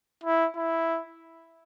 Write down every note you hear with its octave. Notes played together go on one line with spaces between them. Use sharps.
E4
E4